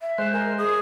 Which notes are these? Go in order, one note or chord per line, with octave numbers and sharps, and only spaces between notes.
E5
G#3 C5 F#6
A#4 G#5
G#4 D#6